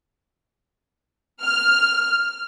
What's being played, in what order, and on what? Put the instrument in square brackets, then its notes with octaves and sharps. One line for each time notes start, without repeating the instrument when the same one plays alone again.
[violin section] F6